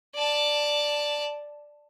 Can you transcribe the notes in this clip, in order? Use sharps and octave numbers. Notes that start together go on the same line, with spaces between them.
D5 A5